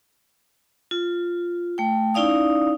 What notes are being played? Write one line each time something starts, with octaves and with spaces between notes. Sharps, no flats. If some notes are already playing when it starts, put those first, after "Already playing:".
F4
A3 G5
C#4 D#4 E4 D5 F5 D#6